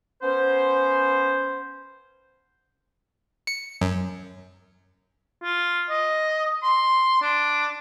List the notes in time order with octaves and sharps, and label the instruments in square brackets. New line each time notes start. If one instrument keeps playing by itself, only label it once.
[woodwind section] B3 C#4 C5
[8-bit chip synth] C#7
F#2
[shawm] F4
D#5
C6
D4